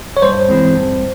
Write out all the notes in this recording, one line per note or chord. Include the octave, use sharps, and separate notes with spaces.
C#5
G2 C5
E3 G#3 C4
G2